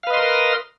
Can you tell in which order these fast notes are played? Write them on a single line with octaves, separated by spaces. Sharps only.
F5 B4 D#5 C6 A#4